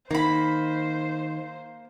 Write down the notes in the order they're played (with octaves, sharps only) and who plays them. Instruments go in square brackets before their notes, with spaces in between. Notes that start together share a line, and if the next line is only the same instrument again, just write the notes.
[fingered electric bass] D#3 [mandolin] A#3 B5 [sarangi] C5